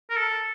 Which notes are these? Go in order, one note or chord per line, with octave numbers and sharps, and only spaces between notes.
A#4
A4